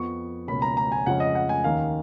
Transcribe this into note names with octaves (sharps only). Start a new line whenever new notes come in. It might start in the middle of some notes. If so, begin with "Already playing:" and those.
Already playing: F2 F3 B3 C#6
C#2 B2 A#3 C#4 B5
A#5
A#5
G#5
F2 C#3 F3 G#3 C#4 F#5
D#5
F#5
G#5
D#2 D#3 A#3 C#4 F5